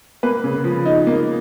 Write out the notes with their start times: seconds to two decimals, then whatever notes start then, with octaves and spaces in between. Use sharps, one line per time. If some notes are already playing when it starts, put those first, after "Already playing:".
0.23 A#3 B4
0.44 C#3
0.64 F3
0.85 D#4
1.07 A#3